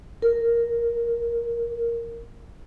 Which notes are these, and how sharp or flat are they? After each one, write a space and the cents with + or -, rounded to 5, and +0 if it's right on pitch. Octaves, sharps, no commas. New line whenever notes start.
A#4 -5